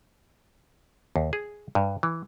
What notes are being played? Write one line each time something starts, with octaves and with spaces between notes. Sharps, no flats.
D#2
G#4
G2
E3